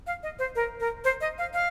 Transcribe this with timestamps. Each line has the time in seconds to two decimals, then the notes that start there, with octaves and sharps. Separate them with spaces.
0.07 F5
0.23 D#5
0.39 C5
0.56 A#4
0.80 A#4
1.04 C5
1.21 D#5
1.38 F5
1.54 F5